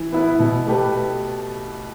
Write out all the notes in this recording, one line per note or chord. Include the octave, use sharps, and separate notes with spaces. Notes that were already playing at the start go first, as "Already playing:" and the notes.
Already playing: E3
B3 E4 B4
B2
A3 G4 B4